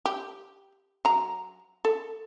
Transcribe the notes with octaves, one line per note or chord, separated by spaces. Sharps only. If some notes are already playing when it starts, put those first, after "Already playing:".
G4
F#3 A#5
A4